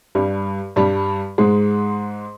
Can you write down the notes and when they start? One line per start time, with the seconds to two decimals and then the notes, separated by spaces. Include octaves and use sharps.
0.15 G2 G3
0.76 G2 G3
1.38 G#2 G#3